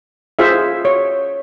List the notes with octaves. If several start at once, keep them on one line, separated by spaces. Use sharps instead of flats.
F4 G#4 C5 E5
C#5